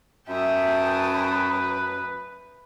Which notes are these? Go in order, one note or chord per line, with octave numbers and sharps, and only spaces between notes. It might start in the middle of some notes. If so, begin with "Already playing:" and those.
F#2 E5 G5 A5 D#6
B4